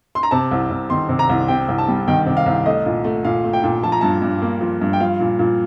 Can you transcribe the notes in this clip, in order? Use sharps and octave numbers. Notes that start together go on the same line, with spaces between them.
C6
A#5
C3 A5
C2
C2
D#3 C6
C3
A#5
C2
C3 G5
C2
A5
G3
D#3 G5
C3
F5
C2
A3 D#5
A#2
A3
A#2 F5
A3
G5
A#2
F3 A5
A#5
G2 A5
G2
A#3
F3
G2
G5
F3 F5
A#2
A#2